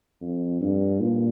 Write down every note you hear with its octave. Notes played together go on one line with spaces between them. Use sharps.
F2
G2
A#2